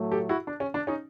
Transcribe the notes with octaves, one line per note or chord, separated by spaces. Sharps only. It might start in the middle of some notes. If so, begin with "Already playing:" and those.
Already playing: A2 F#3 A3
G4 A4
E4 F#4
D4
C#4
D4
C#4 D#4